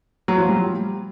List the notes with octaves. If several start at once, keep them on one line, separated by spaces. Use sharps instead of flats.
F#3
F3
G3